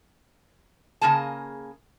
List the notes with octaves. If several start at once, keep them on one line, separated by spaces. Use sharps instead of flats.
C#3 F3 A#3 G#4 A5